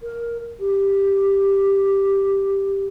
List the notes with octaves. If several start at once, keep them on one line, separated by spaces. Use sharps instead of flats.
A#4
G4